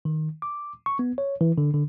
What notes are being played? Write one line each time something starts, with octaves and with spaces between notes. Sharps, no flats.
D#3
D6
C#6
B3
C#5
E3
D3
D3